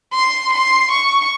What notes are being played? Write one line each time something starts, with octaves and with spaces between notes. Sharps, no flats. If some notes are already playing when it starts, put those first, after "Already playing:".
C6
C6
C#6